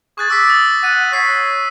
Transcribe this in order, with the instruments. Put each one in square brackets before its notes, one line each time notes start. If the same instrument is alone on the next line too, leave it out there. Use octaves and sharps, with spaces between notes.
[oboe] G#4 [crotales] C#6 F#6 A6
[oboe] D6 [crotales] E6 B6
[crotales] D#6 A6
[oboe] F#5 [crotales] A6 D#7
[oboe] C#5 [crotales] A6 B6 C7